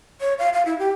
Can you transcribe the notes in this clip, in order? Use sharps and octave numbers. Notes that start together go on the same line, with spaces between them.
C#5
F5
F5
E4
G4